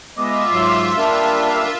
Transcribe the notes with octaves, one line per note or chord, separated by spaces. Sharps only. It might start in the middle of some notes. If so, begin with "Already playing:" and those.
G#3 B3 F4 D#5 E5 D6
G#2 F#3 C6
G3 A#3 D4 A#4